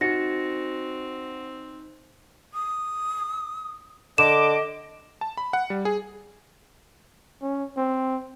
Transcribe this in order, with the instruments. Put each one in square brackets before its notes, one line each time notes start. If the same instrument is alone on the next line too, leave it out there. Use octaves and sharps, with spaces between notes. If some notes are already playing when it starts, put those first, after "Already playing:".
[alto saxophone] C4 [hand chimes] D#4 [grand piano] F#4 [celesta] A#6 C#7
[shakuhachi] D#6
[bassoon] D3 [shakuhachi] D#5 [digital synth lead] D6 [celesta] E7
[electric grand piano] A5
B5
F#5
G3
G#4
[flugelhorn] C#4
C4